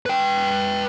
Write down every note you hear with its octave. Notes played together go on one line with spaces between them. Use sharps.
B4 G5